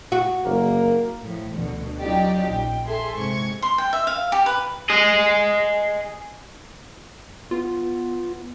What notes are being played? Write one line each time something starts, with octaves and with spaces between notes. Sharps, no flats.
F#4
F#1 A#3
A2 F3
D2 B2 D3
F#3 C#4 D#4 F4 G4 D5
A#1 G5
G#4 A4 E5 C6
G#2 C3 C#6 G#6
C6
G5
E5
F5
G4
B4
G#4 D#5
B3 F4